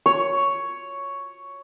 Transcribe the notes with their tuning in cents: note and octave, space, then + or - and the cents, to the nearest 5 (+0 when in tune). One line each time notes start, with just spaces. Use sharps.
C#5 +5